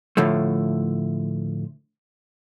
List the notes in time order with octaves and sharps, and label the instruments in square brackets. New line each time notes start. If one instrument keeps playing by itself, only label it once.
[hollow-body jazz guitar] A2 D3 F3 A3